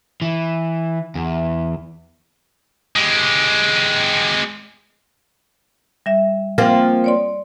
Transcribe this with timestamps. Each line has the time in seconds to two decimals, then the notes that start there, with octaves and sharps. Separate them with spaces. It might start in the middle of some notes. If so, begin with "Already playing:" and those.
0.22 E3
1.15 E2
2.96 G#3 G4
6.06 G3 E5
6.58 F3 A#3 C4
7.04 C#5 D5 C6